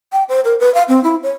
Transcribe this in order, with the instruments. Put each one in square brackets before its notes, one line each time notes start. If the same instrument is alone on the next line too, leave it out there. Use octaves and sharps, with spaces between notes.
[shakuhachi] G5
C5
A#4
B4
F5
C4
E4
C#5